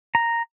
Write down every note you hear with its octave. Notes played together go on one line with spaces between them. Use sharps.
A#5